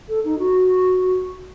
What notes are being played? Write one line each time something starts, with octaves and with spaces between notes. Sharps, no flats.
A4
D#4
F#4